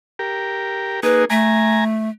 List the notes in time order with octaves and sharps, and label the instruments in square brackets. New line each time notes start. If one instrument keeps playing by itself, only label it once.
[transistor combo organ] G4 A#4
[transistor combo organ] A#3 D#4 G#4 [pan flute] B4
[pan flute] A3 [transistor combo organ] G#5 A#5